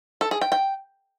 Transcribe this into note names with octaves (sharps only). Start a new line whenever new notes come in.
A4
G#4
G5
G5